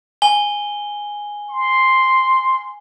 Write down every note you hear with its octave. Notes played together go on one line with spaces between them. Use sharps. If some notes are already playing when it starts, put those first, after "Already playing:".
G#5 G7
C6